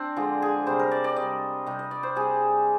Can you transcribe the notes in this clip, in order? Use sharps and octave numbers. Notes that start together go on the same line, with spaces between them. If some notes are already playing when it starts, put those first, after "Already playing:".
Already playing: C4 D4
D3 F3 G#3
G#4
C3 G3 C5
A#4
D5
D5
C3 G3 D#5
C3 G3 D#5
D#5
D5
C5
C3 G3 G#4